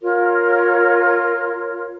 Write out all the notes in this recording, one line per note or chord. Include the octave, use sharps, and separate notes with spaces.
F4 A#4 C#5